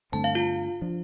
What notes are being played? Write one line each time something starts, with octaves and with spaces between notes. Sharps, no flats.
G2 D3 A3 C4 A5
F5
F4
F3 D4